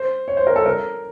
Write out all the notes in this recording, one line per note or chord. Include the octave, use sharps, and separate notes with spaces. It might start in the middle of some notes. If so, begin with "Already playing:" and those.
Already playing: C5
C#5
C5
A#4
A4
A#4